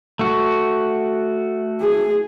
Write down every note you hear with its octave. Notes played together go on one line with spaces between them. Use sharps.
A3 F#4
G#4